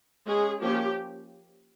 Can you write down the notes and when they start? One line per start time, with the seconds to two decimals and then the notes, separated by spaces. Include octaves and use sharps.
0.27 G#3 C#4 G#4
0.62 F3 A#3 C#4 G4